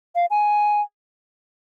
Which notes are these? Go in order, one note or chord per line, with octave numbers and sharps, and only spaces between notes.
F5
G#5